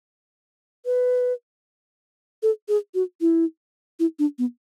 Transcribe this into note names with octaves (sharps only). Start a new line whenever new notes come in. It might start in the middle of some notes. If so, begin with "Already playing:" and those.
B4
A4
G#4
F#4
E4
E4
D4
B3